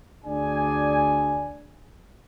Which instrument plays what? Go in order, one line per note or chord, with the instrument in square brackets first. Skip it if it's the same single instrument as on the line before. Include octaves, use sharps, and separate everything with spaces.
[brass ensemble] D2 D4 G#4 D5 G#5